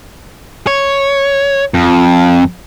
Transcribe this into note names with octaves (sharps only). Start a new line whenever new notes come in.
C#5
F2